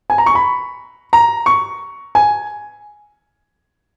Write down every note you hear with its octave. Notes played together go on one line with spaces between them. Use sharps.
G#5
A#5
C#6
B5
A#5
C#6
G#5